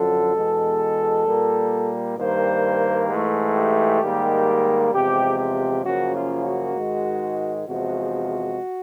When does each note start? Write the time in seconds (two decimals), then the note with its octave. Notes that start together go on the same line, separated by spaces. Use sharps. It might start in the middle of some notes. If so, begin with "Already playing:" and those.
Already playing: F#2 D3 F3 A4
0.35 E2 B2 G#3
1.27 A#2 G3 A#3
2.17 G2 D#3 G3 A#3 C5
3.10 G#2 E3 A3
3.55 G4
4.01 G#2 D#3 G3 A#3
4.92 E2 C3 F3 G#3 G4
5.39 G4
5.84 F#2 C#3 F3 A#3 F#4
6.15 F4
6.44 F#4
6.75 G#2 D#3 G#3
7.67 E2 C3 F3 G#3 F#4